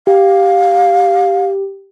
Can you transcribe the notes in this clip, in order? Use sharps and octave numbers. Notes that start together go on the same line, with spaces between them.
G4 F5